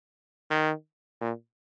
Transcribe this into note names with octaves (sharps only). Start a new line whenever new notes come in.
D#3
A#2